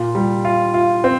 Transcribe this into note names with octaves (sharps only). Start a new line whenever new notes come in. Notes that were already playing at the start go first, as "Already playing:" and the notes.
Already playing: A#2 F4
G3
F4
F4
C4